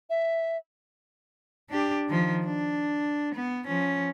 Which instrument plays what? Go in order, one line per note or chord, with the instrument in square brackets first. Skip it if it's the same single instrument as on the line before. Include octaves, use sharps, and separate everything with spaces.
[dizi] E5
[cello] D4 G4
D#3 F3
D4
B3
F3 C#4